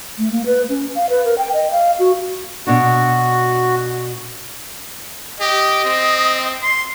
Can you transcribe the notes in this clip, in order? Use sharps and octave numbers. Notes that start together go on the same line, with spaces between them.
A3
A#3
B4
C#4
F5
B4
A#4
G5
D#5
F5
F#4
B2 D4 F#4
G4 D#5
C4
C6